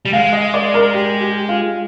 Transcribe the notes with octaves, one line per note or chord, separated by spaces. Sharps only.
G3
G#3 F5
D#5
D5
A#4
G4
G4
F4